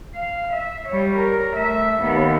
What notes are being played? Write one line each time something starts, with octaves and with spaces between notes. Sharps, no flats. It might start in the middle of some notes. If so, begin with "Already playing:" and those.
F5
E5
G3 C#5
A#4
A3 E5
D#2 B3